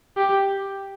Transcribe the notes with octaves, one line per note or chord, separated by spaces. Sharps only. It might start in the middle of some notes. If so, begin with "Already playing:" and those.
G4